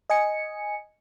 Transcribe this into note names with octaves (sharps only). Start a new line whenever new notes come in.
D#5 G#5 C#7